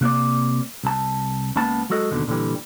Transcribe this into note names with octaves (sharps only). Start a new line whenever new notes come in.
C3 A#3 C4 D5
C2 A5
C#2 C#3 A#3 B3 A5
F#3 G#3 F#4 A4 D#5
D#2 B2 D3 D#3
A#2 D3 E3 G3